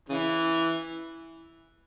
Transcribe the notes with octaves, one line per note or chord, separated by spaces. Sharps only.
C#3 E3